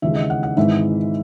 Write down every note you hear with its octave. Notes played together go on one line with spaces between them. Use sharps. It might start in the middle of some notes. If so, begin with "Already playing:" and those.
D#2 C#3 E3 G#3 E5
D#5
F#5
F#5
G#1 G#2 E3 G#3 E5